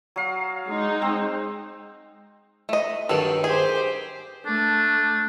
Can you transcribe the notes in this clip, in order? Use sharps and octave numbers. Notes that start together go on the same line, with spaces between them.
F#3 F5
G#3 D#4
C4
A3 D#5
G2 D#3 F#3 G3 A4
G4 G#4 C5
A3 D4